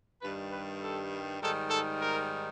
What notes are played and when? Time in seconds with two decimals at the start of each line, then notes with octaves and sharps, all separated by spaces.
0.22 G2 D#3 G3 B4
0.52 B4
0.81 A4
1.41 G#2 D#3 G3 A4
1.70 A4
2.00 A#4